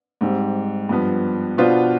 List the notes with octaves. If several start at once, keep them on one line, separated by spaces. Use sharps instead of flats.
G#2 G3 C4 G4
G2 F3 B3
B2 B3 D4 F4 C5